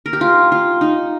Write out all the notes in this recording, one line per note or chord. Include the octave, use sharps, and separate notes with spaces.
A#4
G4
F4
F4
D#4